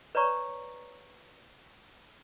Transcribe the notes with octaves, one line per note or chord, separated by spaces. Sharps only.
B4 C#5 D5 A#5 C#6